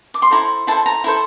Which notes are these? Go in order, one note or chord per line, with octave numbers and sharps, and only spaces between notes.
D6
C6
E4 A4 C5 A#5
E4 A4 C5 A5
A#5
E4 A4 C5